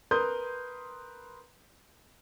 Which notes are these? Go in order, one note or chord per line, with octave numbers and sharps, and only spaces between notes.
A#4 B4 C6 D#6 G6